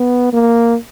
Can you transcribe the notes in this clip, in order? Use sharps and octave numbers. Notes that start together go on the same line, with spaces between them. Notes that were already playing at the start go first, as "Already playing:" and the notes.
Already playing: B3
A#3